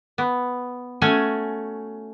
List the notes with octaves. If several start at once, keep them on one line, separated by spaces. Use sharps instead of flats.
B3
A3 C#4 F#4 C#5 G#5